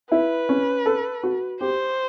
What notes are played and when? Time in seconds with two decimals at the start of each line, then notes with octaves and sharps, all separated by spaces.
0.11 E4 B4
0.49 C#4
0.86 A4
1.23 F#4
1.61 G4 C5